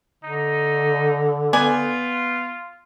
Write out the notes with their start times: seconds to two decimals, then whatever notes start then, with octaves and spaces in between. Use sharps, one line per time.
0.24 D3 D#4
1.53 B3 F4 D5 G#5